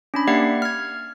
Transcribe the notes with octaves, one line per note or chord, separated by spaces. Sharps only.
C#4 D4 B5
A#3 G4 D5 E5 F#5 C7
F6 G#6